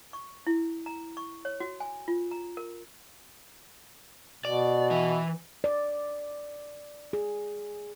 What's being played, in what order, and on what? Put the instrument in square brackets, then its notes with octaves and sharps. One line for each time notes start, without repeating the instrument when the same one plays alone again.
[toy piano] C#6
E4
A#5
C#6
C#5
F#4
G#5
F4
A#5
A#4
[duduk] B2 [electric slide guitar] D5
[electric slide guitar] E3 E5
[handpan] D5
G#4